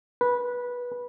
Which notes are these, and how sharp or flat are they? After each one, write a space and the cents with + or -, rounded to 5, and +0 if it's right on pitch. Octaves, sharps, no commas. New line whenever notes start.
B4 -15